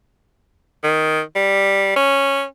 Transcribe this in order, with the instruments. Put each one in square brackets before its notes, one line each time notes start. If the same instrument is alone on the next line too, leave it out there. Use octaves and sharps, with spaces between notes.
[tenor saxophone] D#3
G3
C#4